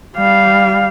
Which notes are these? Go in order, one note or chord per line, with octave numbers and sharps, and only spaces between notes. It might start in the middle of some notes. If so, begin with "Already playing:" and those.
G3 F5